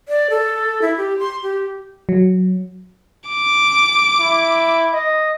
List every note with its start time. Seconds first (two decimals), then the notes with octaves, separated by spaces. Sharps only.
0.09 D5
0.30 A4
0.82 E4
0.97 G4
1.19 C6
1.43 G4
2.09 F#3
3.29 D6
4.20 E4
4.93 D#5